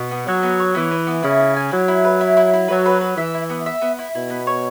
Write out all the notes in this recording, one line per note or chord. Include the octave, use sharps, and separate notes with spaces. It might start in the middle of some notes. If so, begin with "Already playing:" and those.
Already playing: B2
B3
F#3 F#4
B3
C#5
E3 B3
B3
B3
C#3 E4
E4
G#5
F#3 E4
E4
B4
E4
E4
E4
F#3 B4
B4
B4
E3 E5
E4
B3
E5
B3
E4
B2 E4
B3
C#5